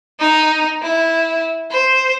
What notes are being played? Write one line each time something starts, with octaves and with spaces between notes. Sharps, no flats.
D#4
E4
C5